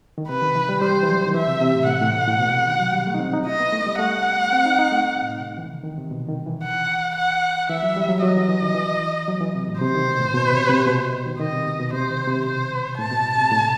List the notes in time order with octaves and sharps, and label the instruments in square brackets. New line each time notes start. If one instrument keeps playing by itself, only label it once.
[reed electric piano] D#3
[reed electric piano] C3 [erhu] B4
[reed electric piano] D#3
E3
G3
[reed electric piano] G3 [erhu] C5
[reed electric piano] E3
F#3
D#3
[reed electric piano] E3 [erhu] E5
[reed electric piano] C3
C3
A2
[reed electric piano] A2 [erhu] F#5
[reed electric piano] A2
B2
A2
B2
C3
D#3
F#3
G3
A3
D#4
C4
D#4
[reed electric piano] E4 [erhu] D#5
[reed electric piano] B3
A3
G3
[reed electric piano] A3 [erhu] F#5
[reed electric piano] C4
D#4
D#4
A3
A2
C3
E3
D#3
D#3
C3
B2
D#3
E3
[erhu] F#5
F#5
[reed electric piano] E3 [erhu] E5
[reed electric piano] F#3
G3
F#3
[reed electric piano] F#3 [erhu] D#5
[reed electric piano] E3
E3
D#3
E3
F#3
E3
C3
A2
[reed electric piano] C3 [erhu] C5
[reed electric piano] D#3
B2
A2
B2
C3
C3
B2
B2
C3
D#3
[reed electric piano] D#3 [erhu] D#5
[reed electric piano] C3
B2
B2
[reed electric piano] C3 [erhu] C5
[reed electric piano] D#3
C3
[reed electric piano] B2 [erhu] C5
[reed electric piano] A2 [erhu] A5
[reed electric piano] B2
C3
A2